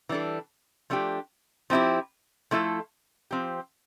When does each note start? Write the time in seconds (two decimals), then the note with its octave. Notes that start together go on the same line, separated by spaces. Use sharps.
0.09 E3 G3 D4 A4
0.90 F3 A3 D4 G4
1.70 F3 C4 E4 G4
2.51 F3 A3 E4 A4
3.31 F3 C4 G4